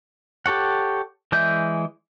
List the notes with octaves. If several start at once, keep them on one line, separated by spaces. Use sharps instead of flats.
G4 A4 C#5 F#5
E3 G#3 D5 E5 G6